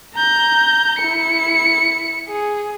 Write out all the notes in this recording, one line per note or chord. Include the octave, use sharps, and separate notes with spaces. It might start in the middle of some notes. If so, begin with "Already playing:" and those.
A#5 G6
E4 C#7
G#4